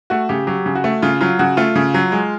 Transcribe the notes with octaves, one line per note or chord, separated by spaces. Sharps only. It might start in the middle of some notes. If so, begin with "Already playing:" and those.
A3 F#4
C#3 G4
F#3 G4
C#3
F#4
A3
C#3 F4
F#3 F4
C#3 F#4
A3 F4
C#3
F#3
G#3